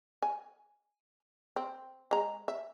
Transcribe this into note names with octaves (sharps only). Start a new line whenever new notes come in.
G#5
C4
G#3 A#5
E5